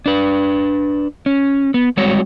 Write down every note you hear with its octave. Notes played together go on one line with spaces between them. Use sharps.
D4 B4
C#4
B3
G3 G#3 C4 F#4 C#5